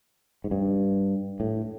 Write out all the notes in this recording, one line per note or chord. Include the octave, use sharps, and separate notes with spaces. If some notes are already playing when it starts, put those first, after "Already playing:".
G#2
G2
A2